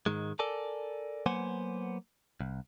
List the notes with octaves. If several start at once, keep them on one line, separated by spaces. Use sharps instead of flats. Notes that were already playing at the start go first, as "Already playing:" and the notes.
G#2 D#3 G#3
A4 A#4 D5 G#5 A5
F#3 A#3 B3 C5 F#5 G#5
C2